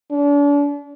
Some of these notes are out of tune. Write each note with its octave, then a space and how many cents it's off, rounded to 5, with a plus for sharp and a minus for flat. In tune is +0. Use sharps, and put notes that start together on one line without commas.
D4 -40